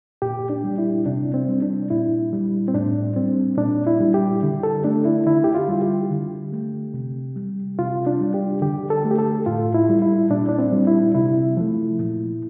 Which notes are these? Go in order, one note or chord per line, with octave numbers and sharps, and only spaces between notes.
A#2 G4
D4
G3
E4
C3 D4
C4
G3
D4
A#2 E4
G3
C4
A2 D4
G3 C4
A#2 D4
E4
G3
G4
D3
A4
A3 D4
E4
D3 E4
G4
F4
G3
G4
D3
A3
C3
G3
C3 F4
D4
G3
G4
D3 G4
A4
A3
G4
A4
A2 F4
E4
G3
E4
A#2 D4
D4
C4
G3
E4
C3 E4
F3 A3
A#2